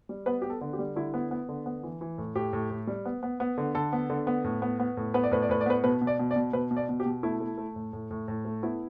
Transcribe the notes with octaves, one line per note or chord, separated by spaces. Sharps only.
G3
B3 B4
B3 G4
A4
D3
G4
G3
D3 E4
B3
B3
D3
B3
E3
E3
A2
A2 G4
A2
A2
G3
B3
B3
B3
D3
D3 A4
B3
D3
B3
A2
B3
B3
A2
B3 B4
D5
A2 B4
D5
A2 B4
D5
B3 B4
B2 B4
B2
D5
B2
D5
B2
B2 B4
B2
D5
B2
G4
B2
A3 E4
A3
A3
A2
A2
A2
A2
A3
B3 E4